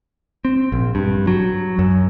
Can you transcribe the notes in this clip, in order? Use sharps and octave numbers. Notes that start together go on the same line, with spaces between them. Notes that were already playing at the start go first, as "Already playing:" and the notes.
C4
A#1
G2
F#3
F#2